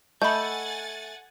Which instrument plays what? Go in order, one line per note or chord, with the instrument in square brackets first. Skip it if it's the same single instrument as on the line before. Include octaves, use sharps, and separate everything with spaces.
[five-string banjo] A3 [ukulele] D#5 [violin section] F#5 G#5 A6 [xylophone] B5 G6